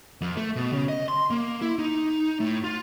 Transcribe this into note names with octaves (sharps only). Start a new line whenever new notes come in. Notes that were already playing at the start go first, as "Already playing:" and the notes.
F2
A3
B2
C#3
D#5
C6
A#3
E4
D#4
A2
F4